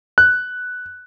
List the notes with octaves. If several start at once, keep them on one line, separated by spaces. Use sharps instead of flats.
F#6